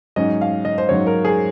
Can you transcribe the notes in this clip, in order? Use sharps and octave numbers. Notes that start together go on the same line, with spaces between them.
G#2 F#3 C#4 D#5
F5
D#5
C5
G#2 F#3 C#4 C#5
A#4
G#4